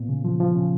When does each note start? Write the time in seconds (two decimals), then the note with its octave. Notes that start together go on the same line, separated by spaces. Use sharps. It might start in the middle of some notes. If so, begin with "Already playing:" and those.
Already playing: A#2 B3
0.09 C#3
0.25 F3
0.40 F3
0.55 C#3